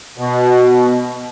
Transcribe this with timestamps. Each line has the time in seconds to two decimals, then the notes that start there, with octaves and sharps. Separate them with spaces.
0.18 B2